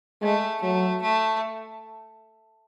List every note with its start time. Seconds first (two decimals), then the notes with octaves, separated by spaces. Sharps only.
0.22 G#3 A3
0.62 F#3 A3
1.02 A3